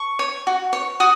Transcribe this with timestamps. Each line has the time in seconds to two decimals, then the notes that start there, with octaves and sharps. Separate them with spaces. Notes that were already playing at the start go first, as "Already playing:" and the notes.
Already playing: C#6
0.19 C#5
0.47 F#4
0.73 C#5
1.00 F#4 D#6